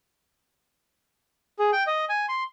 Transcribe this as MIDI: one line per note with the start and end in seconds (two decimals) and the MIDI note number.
1.59 1.71 68
1.73 1.84 79
1.87 2.05 75
2.09 2.26 80
2.29 2.43 84